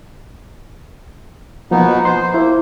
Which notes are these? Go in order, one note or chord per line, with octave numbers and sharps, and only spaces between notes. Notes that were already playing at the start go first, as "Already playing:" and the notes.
B2 F3 A#3 B3 D#4
C5 C6
A#3 E4 C5